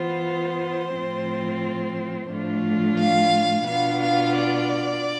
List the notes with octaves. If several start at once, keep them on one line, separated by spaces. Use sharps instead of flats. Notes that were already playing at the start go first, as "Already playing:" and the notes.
Already playing: E3 B3 F4 C5
A2 F3 C4 F4
A2 F3 A3 D4 F4
F5
B2 B3 D4 F4 F5
F5
D5